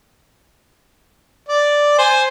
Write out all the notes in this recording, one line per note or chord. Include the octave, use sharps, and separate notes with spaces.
D5
C5 G#5